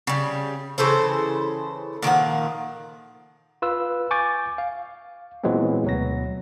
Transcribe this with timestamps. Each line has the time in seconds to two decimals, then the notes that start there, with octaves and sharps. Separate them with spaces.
0.07 C#3 G3
0.78 C#3 E3 A4 C5
2.02 A#2 D#3 F3 F#5
3.62 F4 B4 E6
4.11 G#5 C#6 D6 G6 A6
4.58 F5
5.44 A#2 E3 F#3 G#3 B3 C4
5.84 D2 B2 F#3 B3 A#6